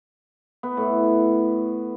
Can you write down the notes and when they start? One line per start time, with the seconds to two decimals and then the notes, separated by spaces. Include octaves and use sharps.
0.63 B3
0.77 A2